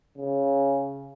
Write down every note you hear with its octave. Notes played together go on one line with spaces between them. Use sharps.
C#3